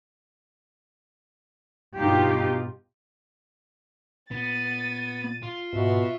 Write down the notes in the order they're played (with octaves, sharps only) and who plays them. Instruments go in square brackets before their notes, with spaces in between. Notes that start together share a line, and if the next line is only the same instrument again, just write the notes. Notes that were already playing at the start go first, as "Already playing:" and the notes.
[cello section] G2 B2 D#4 F4 G4
[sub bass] A#2 [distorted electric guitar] B3 [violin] A6 D#7
[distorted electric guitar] F4
[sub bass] G#2 [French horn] B2 [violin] F#4 E5